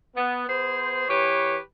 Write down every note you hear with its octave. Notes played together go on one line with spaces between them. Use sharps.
B3
B3 G#4 C5
E3 G4 B4 C#5